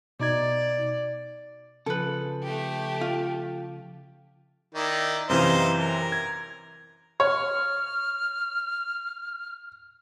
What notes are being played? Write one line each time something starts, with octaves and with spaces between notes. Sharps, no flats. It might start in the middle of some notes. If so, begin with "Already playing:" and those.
B2 D#4 D5 G#6
C#3 F3 A4 B4
A3 G4
F4
D#3 E4 D5
F#2 C3 E3 D#4 C5 F5
A#4
G#6
C#5 F6